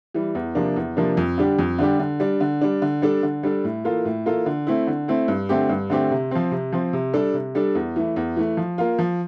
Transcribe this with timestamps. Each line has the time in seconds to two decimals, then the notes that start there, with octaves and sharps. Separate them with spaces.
0.14 E3 G3
0.35 E2
0.55 C3 F3 A#3 D4
0.76 E2
0.97 C3 F3 A#3 D4
1.17 F2
1.38 D3 G3 D4 G4
1.59 F2
1.79 D3 G3 D4 G4
2.00 D3
2.20 G3 D4
2.41 D3
2.61 G3 D4
2.82 D3
3.02 G3 D4 A4
3.23 D3
3.43 G3 D4 A4
3.64 A2
3.84 E3 A#3 F4 A4
4.05 A2
4.26 E3 A#3 F4 A4
4.46 D3
4.67 A3 C4 E4
4.87 D3
5.08 A3 C4 E4
5.28 G2
5.49 D3 A3 C4 G4
5.69 G2
5.90 D3 A3 C4 G4
6.11 C3
6.31 F3 C4
6.51 C3
6.72 F3 C4
6.93 C3
7.13 G3 D4 A4
7.34 C3
7.55 G3 D4 A4
7.75 E2
7.96 E3 A3
8.16 E2
8.37 E3 A3
8.57 F3
8.78 A#3 F4
8.99 F3